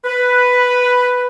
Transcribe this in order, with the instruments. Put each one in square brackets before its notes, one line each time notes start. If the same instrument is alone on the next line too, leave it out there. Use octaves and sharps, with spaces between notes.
[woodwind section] B4